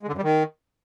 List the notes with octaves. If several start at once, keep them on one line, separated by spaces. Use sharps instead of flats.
G#3
D3
F#2
G3
D#3